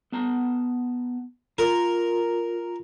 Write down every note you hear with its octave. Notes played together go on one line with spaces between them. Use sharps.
B3 A5 A#5
F4 A#4